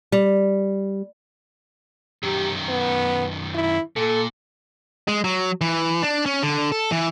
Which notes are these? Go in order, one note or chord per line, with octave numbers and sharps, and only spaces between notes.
G3
F#2 D#3 G4
B3
E4
A#2 A4
G#3
F#3
E3
D4
C#4
D3
A4
E3